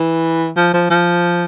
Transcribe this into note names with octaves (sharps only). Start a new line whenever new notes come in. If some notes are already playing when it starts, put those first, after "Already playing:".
Already playing: E3
F3
F3
F3